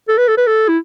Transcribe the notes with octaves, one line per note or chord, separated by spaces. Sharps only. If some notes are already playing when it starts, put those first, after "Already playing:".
A4
B4
A4
B4
A4
E4